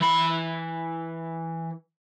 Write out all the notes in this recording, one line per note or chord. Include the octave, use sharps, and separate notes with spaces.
E3 B5